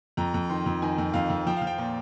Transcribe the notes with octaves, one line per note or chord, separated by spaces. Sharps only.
F2 A#5
F2
D#3 C6
F2
D#3 G#5
F2
F2 F5
F2
F3 G5
F5
F3
G5
A#2